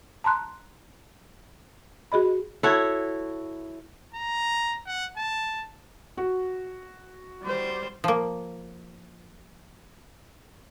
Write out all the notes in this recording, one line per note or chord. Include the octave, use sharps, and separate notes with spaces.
A5 A#5 C6 F#6
F#4 G#4 D#5 B5
E4 F#4 A4 C#5
A#5
F#5
A5
F#4
G3 C5
F3 A#3